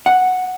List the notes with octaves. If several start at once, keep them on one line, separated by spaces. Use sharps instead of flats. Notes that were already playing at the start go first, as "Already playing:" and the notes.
F#5